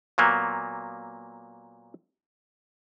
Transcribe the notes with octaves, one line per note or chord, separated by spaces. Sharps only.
A#2 F#3 A#3 B3